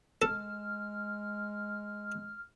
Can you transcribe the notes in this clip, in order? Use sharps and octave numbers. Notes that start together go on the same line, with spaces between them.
G#3 A4 F6